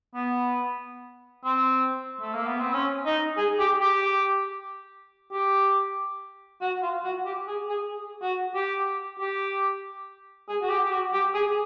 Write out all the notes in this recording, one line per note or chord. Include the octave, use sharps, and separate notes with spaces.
B3
C4
A3
A#3
B3
C4
C#4
D#4
G#4
G4
G4
G4
F#4
F4
F#4
G4
G#4
G#4
F#4
G4
G4
G#4
F#4
G4
G4
F#4
G4
G#4